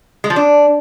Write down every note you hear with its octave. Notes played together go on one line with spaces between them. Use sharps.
G#3
F3
D4